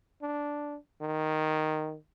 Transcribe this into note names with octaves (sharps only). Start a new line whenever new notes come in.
D4
D#3